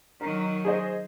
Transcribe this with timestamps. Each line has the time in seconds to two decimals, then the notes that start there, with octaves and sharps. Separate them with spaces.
0.21 D#3 F#3 A#4
0.65 G#4 C5 D#5